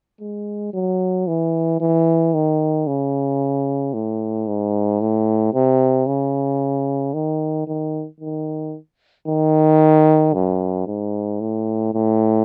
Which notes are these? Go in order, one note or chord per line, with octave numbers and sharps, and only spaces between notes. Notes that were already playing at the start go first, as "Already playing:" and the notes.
G#3
F#3
E3
E3
D#3
C#3
A2
G#2
A2
C3
C#3
D#3
D#3
D#3
D#3
F#2
G#2
A2
A2